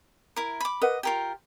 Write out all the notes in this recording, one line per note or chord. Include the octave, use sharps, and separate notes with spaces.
E4 A#4
B5 D6
A#4 B4 D#5 F#5
F4 G4 A#4 G5